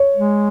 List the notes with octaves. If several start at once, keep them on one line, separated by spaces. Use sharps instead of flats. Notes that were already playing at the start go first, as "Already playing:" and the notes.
Already playing: C#5
G#3